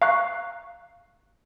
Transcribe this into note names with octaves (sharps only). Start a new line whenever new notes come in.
F5 A#5 C#6 F#6 C7